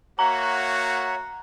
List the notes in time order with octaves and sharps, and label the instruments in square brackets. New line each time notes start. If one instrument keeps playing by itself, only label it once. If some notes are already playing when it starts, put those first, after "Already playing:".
[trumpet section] A#3 F#4 [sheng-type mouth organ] C#5 E5 F#5 [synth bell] A#5